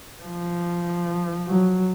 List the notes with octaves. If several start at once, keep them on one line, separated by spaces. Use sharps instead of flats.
F3
F#3